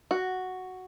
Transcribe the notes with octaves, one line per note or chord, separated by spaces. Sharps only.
F#4